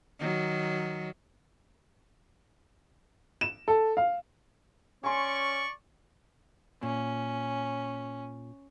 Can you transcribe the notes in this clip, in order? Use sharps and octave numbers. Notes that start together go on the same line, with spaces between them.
D#3 F#3
E7
A4
F5
C#4 D5 G#5 C6 C#6
A#2 C#4